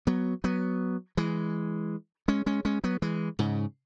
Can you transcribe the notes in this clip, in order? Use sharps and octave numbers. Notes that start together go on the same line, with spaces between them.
F#3 B3
F#3 B3
E3 G#3
G#3 C#4
G#3 C#4
G#3 C#4
F#3 B3
E3 G#3
G#2 C#3